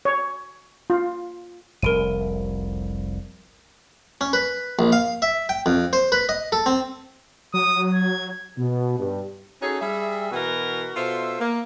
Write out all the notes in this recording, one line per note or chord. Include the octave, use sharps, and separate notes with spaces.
C#5
F4
F1 C2 A#4 D7 D#7
C#4
B4
A#1
F5
E5
G5
F2
C5
B4
D#5
A4
C4
F#3 D#6
G#6
B2
G2
C#4 D#4 F#4 G#4 A4 C#5
G3 G#4 E5
B2 E3 B3 F#4 A#4 B4
B2 F4 A4 C5 E5
A#3